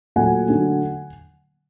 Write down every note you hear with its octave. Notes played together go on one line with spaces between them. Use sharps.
A#2 F#3 A3 F#5 G#5
D3 F#3 A3